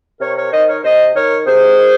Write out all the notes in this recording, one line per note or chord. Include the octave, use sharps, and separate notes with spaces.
C3 A#4 C#5
A#4 C#5
D#3 C5 D#5
A#4 C#5
C3 C5 D#5
D#3 A#4 C#5
C3 G#4 C5
D#3